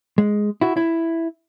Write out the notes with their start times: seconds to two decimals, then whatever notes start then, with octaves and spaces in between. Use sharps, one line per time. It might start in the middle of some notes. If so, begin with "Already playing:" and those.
0.18 G#3
0.61 E4 F#4
0.77 E4